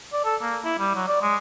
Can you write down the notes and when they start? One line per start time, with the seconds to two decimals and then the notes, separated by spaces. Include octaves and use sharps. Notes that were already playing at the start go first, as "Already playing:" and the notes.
0.13 D5
0.25 A4
0.42 A#3
0.65 E4
0.79 G3
0.96 F#3
1.09 D5
1.22 G#3